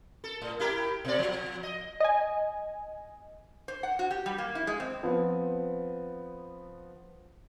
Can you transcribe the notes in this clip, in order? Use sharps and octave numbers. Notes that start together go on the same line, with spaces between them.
A4
A2
E4 G4 A#4
B2 D5
F3
D#5
D#5 G#5
C5
F#5
F#4
G4
G3
A#3
E4
G#3
C4
F3 B3 C4